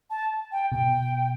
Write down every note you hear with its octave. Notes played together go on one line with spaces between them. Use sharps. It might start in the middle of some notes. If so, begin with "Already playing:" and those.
A5
G5
B2 G5